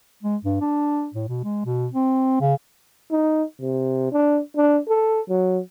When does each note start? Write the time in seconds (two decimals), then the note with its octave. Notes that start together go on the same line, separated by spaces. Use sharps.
0.23 G#3
0.45 G2
0.61 D4
1.14 A2
1.29 B2
1.44 G#3
1.66 B2
1.93 C4
2.41 C#3
3.12 D#4
3.61 C3
4.12 D4
4.56 D4
4.89 A4
5.29 F#3